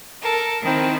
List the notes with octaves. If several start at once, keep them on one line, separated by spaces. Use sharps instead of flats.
A4 A#4
D#3 C4 E4